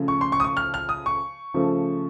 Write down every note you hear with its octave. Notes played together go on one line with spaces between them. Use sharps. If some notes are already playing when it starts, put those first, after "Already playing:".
Already playing: C#3 F3 A3
C#6
C6
C#6
D#6
C#6
F6
F6
D#6
C#6
C#3 F3 A3